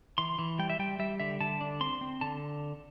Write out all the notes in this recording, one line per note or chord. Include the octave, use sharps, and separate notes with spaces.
E3 C6
E3
G3 G5
E5
G3 G5
G3 E5
D3 E5
D3 A5
D4
C4 C6
C4
D3 A5